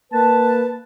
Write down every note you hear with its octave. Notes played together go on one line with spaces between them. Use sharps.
A#3 B4 A5